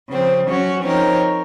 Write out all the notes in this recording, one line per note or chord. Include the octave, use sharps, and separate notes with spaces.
C#3 F3 C4
F#3 C#4 F#4
F3 C4 D#4 A#4 C#5